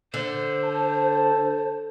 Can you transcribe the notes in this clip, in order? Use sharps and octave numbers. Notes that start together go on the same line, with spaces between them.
D3 C5
A5